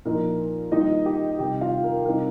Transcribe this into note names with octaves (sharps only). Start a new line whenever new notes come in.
A#2 F3 D#4 A#4
D#3 G3 A#3 D#4 F4 D#5
G4 G5
C3 D#3 G3 G4 G5
F4 F5
A#4
C3 G3 C4 D#4 A#4